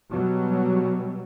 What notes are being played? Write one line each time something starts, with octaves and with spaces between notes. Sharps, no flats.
B2 F#3 G3